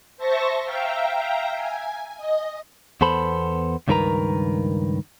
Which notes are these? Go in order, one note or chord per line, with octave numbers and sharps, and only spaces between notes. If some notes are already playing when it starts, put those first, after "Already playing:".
C5 E5 A5 C#6 A#6
E5 F5 G5 A#5
G#5
D#5
E2 B3 A4 C5 B5
C#2 G2 D#3 A#4 B4 A#5